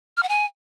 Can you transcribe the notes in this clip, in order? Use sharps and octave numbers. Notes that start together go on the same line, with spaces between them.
F6
F#5
G#5